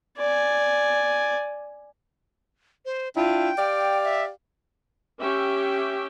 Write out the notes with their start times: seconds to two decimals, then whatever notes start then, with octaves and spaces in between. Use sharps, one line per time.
0.18 D5 G#5
2.86 C5
3.16 D4 E4 F4 G5
3.57 G4 D5 F5
4.04 E5
5.21 C#4 G4 E5 G5